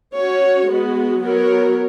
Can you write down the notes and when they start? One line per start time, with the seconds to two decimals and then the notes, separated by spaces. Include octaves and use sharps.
0.16 C#4 F#4 C#5
0.69 G#3 B3 F#4
1.22 F#3 B3 F#4 A#4 C#5